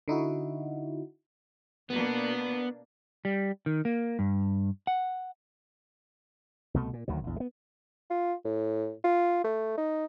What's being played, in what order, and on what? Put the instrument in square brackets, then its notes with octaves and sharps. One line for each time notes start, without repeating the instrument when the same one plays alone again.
[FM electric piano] D3 D#4 E4 F#4
[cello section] B2 A#3 D4 [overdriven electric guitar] B3
[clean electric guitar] G3
D#3
A#3
G2
F#5
[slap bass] C2 B2 A3
A#2
D2 D#3 F#3
A#1 E2
G#3 B3
[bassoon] F4
A2
F4
A3
D#4